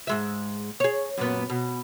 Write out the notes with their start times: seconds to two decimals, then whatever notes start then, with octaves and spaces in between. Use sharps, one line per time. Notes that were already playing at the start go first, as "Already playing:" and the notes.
0.07 G#2 G#3 E5
0.80 G#4 C#5
1.17 F#2 A#2 B3
1.50 B2